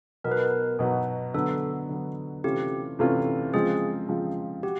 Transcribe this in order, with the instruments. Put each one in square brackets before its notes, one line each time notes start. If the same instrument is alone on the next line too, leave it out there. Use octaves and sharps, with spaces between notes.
[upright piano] B2 F#3 B3 D#4 F#4 [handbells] A#4
[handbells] B4
A#4
[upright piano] B2 F#3 B3 D#4 F#4
[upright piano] D3 F#3 B3 [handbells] A4
[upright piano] D3 F#3 B3
[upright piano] C3 E3 A3 C#4 F4 [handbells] G4
[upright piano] C3 E3 A3 C#4 F4
[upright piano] C#3 F3 G#3 C4 F4 [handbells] G#4
[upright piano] C#3 F3 G#3 C4 F4
[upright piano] F#4 [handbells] G4